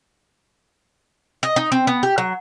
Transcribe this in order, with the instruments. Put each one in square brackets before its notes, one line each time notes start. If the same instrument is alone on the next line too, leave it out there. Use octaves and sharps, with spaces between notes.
[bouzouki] D#5
D#4
C4
B3
G4
F#3